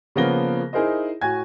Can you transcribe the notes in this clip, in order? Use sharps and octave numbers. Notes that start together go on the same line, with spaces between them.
C#3 F3 A#3 B3 A#6 G7
D#4 E4 G#4 A#4 C5 D#5
A2 F#4 G#5 G#6